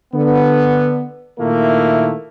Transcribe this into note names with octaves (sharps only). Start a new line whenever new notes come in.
D3 B3
A#2 D#3 A3 A#3 E4 A#4